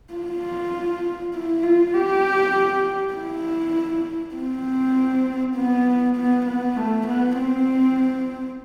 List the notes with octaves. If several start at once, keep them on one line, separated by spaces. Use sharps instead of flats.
F4
E4
F4
G4
E4
C4
B3
B3
B3
A3
B3
C4